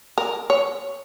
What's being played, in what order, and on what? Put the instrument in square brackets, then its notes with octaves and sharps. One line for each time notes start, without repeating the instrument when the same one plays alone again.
[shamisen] A#4
C#5